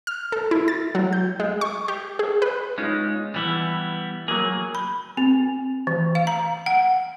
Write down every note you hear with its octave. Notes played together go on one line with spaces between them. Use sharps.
F6
A4
E4
A6
F#3
G6
G#3
C#6
G4
G#4
B4
G#3 C#4 D#4 F4
E3 G3 B3 E4 G#5
F#3 A#3 G#4
B5
C4
E3
F5
A#5
F#5